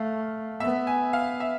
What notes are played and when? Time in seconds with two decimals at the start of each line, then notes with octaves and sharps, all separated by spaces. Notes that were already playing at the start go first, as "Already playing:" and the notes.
Already playing: A3 F5
0.60 B3 E5
0.87 G#5
1.13 F5
1.40 E5